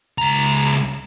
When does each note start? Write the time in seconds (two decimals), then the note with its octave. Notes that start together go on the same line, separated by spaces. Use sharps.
0.18 C#2 A#5